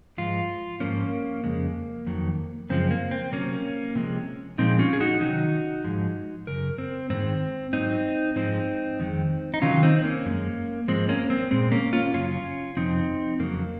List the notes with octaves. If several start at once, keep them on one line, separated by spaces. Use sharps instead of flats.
G#2 F3 G#3 F4
G#2 F3 A#3 C#4
F2 C#3 G#3
F2 D#3 F#3
F#2 C#3 F3 G#3 C4
A#3
C4
C3 F#3 A#3 C#4
C3 F3 G#3
A#2 F3 G#3 C4 D#4
C#4 F4
G#4
D#4 F#4
C3 D#3 F#3 D#4 F#4
G#2 F3 G#3
F#2 C#3 A#4
C4
G#2 D#3 G#3 C4
G#2 F#3 C4 D#4
G#2 F3 G#3 C4 D#4
F2 D#3 G#3
D#4
C3 D#3 F#3 C#4 F4
C4 D#4
A#3 C#4
F#2 F3 G#3
G#2 F3 G#3 C4
A#3 C#4
C4
A#2 G#3 C4
A#3 C#4
C#4 F4
F#2 C#3 F#3 C#4 F4
F2 C3 F3 C4 D#4
F2 C#3 F#3 A#3